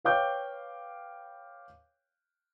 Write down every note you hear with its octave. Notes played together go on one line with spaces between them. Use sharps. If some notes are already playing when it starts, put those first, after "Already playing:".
B4 C#5 F5 G5 D6 G6